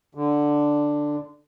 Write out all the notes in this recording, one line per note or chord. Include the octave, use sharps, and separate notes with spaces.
D3